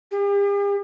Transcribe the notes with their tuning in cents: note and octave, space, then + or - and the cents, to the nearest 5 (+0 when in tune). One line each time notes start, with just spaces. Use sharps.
G4 +45